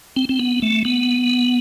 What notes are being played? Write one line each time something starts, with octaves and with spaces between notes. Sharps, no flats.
C4
C4
B3
A3
B3